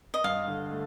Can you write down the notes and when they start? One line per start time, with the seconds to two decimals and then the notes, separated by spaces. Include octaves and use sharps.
0.14 D#5
0.24 G2 F5
0.48 D3
0.71 A3